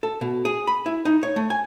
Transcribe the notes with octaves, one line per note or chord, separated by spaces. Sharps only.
A4
B2
G#4
B5
E4
D#4
C#5
A3
G#5